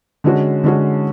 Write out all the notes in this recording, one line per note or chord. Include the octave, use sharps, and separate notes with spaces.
D3 G#3 C#4 F#4
D3 G#3 C#4 F#4